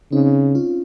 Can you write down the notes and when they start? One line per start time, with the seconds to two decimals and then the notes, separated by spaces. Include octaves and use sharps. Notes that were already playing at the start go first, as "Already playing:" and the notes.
0.12 C#3 C4 D#4
0.55 C#4 F4